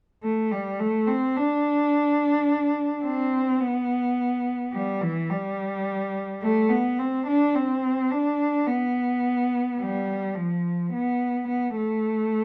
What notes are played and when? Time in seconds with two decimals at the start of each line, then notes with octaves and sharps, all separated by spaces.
0.24 A3
0.52 G3
0.80 A3
1.07 C4
1.36 D4
3.05 C4
3.60 B3
4.73 G3
5.02 E3
5.29 G3
6.42 A3
6.70 B3
6.99 C4
7.27 D4
7.55 C4
8.11 D4
8.68 B3
9.80 G3
10.35 F3
10.93 B3
11.48 B3
11.76 A3